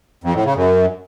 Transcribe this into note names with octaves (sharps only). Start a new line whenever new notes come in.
F2
A2
C#3
F#2